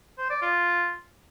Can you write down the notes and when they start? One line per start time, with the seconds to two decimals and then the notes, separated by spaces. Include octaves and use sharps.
0.18 C5
0.30 D5
0.42 F4